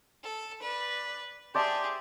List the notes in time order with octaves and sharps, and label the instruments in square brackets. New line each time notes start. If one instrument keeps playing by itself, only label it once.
[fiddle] A4
[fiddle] B4 [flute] D5
[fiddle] G4 G#4 [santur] C5 D5 E5 [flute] A5